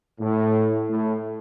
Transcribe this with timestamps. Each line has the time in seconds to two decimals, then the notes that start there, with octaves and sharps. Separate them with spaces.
0.21 A2
0.90 A2